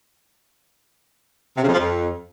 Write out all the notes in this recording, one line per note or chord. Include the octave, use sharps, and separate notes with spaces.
C3
C#3
F2
F3
F2